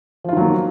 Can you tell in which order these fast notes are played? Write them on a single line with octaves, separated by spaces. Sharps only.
F3 F4 D#3 F#3 A#3